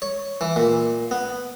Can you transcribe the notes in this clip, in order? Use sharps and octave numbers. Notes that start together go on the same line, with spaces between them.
C#5
E3
A#2
B3